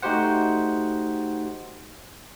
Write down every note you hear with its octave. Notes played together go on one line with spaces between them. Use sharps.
A3 D#4 F#4 G4 C5 F#5